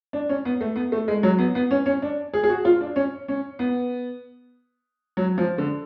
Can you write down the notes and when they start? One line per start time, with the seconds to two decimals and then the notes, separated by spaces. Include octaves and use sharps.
0.13 D4
0.29 C#4
0.45 B3
0.61 A3
0.76 B3
0.92 A3
1.08 G#3
1.23 F#3
1.39 B3
1.55 B3
1.71 C#4
1.86 C#4
2.02 D4
2.34 G#4
2.44 G#4
2.49 F#4
2.65 F4
2.81 D4
2.96 C#4
3.28 C#4
3.59 B3
5.17 F#3
5.38 F3
5.58 D3